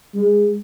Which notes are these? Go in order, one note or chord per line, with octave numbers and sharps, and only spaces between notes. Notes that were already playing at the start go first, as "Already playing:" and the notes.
G#3